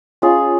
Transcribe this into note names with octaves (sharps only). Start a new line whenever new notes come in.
C#4 F4 G#4